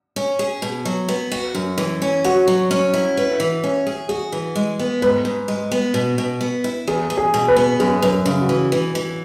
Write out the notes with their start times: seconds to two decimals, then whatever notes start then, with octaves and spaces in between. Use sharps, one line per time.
0.16 C#4
0.39 G#4
0.62 B2
0.85 F#3
1.09 B3
1.32 F#4
1.55 F#2
1.78 E3
2.02 C#4
2.24 F#4 C#5
2.48 F#3
2.71 C#4
2.94 E4
3.17 B4
3.40 E3
3.64 C#4
3.87 G#4
4.09 F#4 G#4
4.32 E3
4.55 G#3
4.79 B3
5.02 G#2 B4
5.25 G#2
5.48 G#3
5.71 B3
5.94 B2
6.18 B2
6.41 B3
6.64 E4
6.87 E2 G#4
7.10 E2
7.17 G#4
7.34 B2
7.48 B4
7.56 B3
7.80 F#2 G#4
8.02 F#2 B4
8.11 G#4
8.26 C#3
8.41 F#4
8.49 E3
8.72 E3
8.95 E3